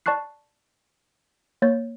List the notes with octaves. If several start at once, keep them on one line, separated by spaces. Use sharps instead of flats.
D5 A5 C#6 F#6 C7
A#3 C#5 G6 A6